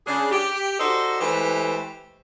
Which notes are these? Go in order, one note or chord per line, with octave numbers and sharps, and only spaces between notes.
C#3 D4 G#4
G4
D#4 F#4 A4 C5 D5 D#5
E3 G#3 A3 G4 B4 C5